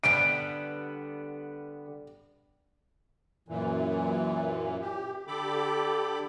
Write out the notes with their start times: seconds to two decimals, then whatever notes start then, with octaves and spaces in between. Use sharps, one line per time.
0.04 D3 G3 B3 D7
3.49 F#2 A#2 E3
4.81 G4
5.27 D3 G4 A4 B5 D6